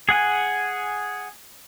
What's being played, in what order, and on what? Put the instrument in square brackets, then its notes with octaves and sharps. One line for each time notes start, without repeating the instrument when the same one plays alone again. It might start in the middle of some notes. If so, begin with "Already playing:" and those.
[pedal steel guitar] G#4 F#5 G#5